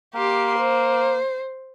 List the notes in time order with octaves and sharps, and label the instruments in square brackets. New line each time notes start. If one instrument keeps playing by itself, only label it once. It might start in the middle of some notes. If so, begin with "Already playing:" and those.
[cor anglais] A#3 [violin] G4 C6
[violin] C5